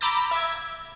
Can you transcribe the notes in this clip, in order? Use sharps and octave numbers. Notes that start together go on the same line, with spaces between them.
A#5 B5 D6 E6 G6 A6
E5 G#6